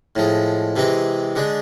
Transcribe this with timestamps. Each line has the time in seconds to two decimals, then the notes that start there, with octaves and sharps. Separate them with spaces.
0.16 A2 F3 G#3
0.76 C3 E3 G#3 C4
1.36 D3 G#3 D4